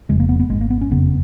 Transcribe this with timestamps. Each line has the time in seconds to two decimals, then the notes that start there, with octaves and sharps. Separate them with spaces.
0.09 F1 F2 C#3 G#3
0.20 A#3
0.29 B3
0.40 B3
0.49 G#1 G#2 G#3
0.61 A#3
0.70 B3
0.81 C#4
0.91 F#1 F2 C#3 B3